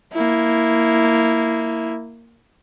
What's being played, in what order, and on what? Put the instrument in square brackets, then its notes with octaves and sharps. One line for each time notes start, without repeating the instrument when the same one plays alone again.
[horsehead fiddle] A#3 E4